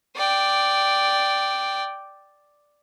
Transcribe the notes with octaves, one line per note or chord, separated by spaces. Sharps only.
D5 G5